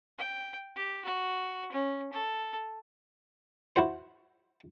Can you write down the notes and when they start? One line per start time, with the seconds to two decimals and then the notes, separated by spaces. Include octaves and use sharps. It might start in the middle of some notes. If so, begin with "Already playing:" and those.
0.18 G5
0.75 G4
1.05 F#4
1.72 C#4
2.12 A4
3.76 E4 F#4 C5